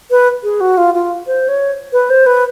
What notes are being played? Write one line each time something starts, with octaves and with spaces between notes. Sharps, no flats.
B4
G#4
F#4
F4
F4
C5
C#5
B4
C5
B4